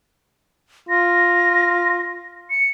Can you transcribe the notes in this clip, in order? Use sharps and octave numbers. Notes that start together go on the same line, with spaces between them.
F4 A#6
C#7